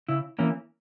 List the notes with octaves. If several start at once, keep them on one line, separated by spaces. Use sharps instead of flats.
C#3 E4
E3 A#3 C#4